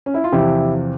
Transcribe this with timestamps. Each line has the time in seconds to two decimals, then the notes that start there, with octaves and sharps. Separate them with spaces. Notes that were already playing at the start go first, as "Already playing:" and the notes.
0.06 C#4
0.14 E4
0.24 F4
0.32 E2 C3 F3 E4 G4